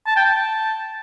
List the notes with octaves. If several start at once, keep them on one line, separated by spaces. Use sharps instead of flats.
A5
G5
A5